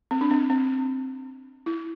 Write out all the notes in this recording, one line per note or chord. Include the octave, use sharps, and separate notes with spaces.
C4
D4
C4
C4
E4